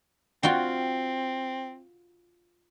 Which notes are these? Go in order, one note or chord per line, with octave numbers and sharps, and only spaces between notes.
C4 F4 F#4 G5